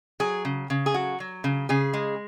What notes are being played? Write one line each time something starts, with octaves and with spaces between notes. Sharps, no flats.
F#3 G#4
C#3
C#3
G#4
F#3 F#4
F#3
C#3
C#3 G#4
G#3